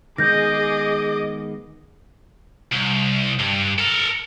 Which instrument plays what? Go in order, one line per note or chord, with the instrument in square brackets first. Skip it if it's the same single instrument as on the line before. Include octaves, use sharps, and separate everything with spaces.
[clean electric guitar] D#3 G#3 B3 [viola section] G#4 [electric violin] D#5 D6 [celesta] G6 A#6
[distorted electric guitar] C2
G2
A4 A#4